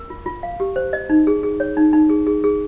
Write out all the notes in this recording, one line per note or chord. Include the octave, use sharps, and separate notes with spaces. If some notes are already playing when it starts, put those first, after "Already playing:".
Already playing: A#4
F4
F4
F5
G4
C5
D#5
D#4
G#4
G#4
C#5
D#4
D#4
G#4
G#4
G#4